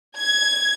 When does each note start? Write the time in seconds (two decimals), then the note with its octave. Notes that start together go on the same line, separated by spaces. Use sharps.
0.15 G#6